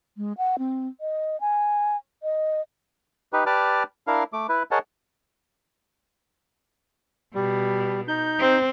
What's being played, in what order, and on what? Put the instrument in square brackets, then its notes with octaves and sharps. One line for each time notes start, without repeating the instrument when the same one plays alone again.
[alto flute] G#3
F#5
C4
D#5
G#5
D#5
[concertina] D#4 G4 B4
G4 B4 D5 A5 D6 F6
D4 E4 A#4 F5
A3 D6
E4 B4
G#4 A#4 C#5 D#5 F#5 A5
[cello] B2 [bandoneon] G3
[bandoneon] D#4 G6
[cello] C4